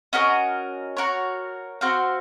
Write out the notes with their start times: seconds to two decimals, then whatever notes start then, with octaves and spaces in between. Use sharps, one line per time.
0.13 C#4 F#4 A#4 D#5
0.97 F#4 A#4 C#5
1.81 C4 F#4 C5 F5